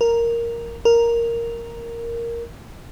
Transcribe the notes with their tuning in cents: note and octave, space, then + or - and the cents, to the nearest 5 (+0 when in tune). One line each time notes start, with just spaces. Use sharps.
A#4 +0
A#4 +0